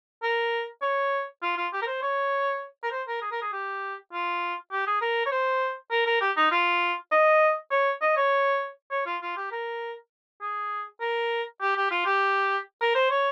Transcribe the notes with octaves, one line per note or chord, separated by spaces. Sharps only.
A#4
C#5
F4
F4
G4
A#4
C5
C#5
A#4
C5
A#4
G#4
A#4
G#4
G4
F4
G4
G#4
A#4
C#5
C5
A#4
A#4
G4
D#4
F4
D#5
C#5
D#5
C#5
C#5
F4
F4
G4
A#4
G#4
A#4
G4
G4
F4
G4
A#4
C5
C#5